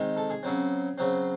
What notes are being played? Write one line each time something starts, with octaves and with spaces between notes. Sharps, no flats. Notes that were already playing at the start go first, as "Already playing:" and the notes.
Already playing: D#3 G#3 C4
A4
G#4
C#3 F#3 C4
C#3 F#3 C4